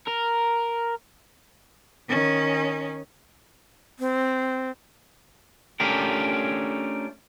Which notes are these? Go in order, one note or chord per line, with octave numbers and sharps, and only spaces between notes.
A#4
D#3 C#4
C4
A3 C#4 D4 F4 G4 A#4